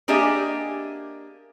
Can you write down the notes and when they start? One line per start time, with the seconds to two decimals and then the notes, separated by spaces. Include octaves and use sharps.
0.08 A#3 D4 G4 G#4 D#5 E5